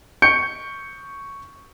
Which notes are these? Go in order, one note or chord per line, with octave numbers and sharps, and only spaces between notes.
C#6 G6 C#7 D7